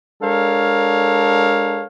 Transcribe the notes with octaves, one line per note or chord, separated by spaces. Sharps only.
G#3 D4 A4 A#4 C#5 F5